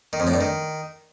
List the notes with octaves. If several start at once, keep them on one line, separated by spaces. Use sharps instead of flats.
D#3
F2
A2
G2
D#3